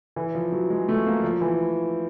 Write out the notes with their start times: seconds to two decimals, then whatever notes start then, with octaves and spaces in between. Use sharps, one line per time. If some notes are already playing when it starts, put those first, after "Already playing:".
0.16 E3
0.35 F3
0.52 F#3
0.70 G#3
0.89 A3
1.07 A#3
1.24 F3
1.41 E3